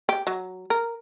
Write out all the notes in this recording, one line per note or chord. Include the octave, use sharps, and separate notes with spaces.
G4
F#3
A#4